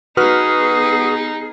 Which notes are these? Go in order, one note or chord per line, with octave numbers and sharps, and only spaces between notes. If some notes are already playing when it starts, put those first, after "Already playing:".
B3 D#4 F#4 G#4 B4 D#6 F6